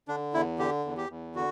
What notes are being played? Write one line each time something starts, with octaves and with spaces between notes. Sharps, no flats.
D3 D4
E2 E4
D3 G4
E2
G4
E2
D3 F#4